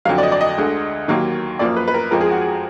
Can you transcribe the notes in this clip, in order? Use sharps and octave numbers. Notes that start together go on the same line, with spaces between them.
F2 D3 F#3 F5
D5
D#5
D5
D#5
D2 D3 G#3
D#2 D#3 F#3 A#3
F#2 F3 A#3 D5
B4
B4
A#4
F2 F3 G#3 A#4
G#4
F#4
G#4